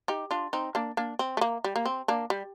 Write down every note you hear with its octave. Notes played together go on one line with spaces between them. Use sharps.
D#4 G4
D4 F4
C4 D#4
A#3 D4
A#3 D4
C4
A3
A#3
G3
A#3
C4
A#3 D4
G3